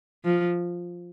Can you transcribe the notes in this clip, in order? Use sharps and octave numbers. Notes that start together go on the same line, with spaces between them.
F3